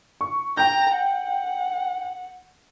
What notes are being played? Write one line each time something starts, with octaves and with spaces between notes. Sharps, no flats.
C#6
G5 A#5 G6
F#5